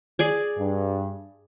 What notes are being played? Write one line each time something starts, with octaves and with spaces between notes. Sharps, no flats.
G#4 D5 G#5
G2